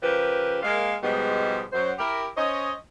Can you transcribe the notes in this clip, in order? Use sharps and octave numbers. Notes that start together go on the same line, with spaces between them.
C#3 F3 G4 A#4 B4
G#3 A#3 F5
G#2 B2 F3 G3 G#3 B3
F#2 F#3 C5
E4 G4 A#4
C#4 C5 C#5 D#5